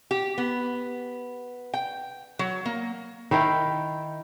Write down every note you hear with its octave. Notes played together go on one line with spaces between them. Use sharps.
G4
B3
G5
F#3
A#3
D#3 E4 F5 G5